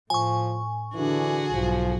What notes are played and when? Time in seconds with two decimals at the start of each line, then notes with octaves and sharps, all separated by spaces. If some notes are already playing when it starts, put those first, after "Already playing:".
0.10 A2 F3 G#5 C#6
0.95 D3 E3 D4 F#4 G#4
1.53 B1 G#2 F3